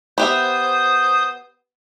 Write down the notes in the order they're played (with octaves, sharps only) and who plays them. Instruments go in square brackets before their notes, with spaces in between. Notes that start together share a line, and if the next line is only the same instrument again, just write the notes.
[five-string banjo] B3 G4 E5 [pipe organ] C5 D#6